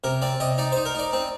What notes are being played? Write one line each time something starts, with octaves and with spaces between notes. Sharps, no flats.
C3 A#4
C4 D5
C3 D#5
D#4 D5
D#4 C5
A#4
D#4 D5
C4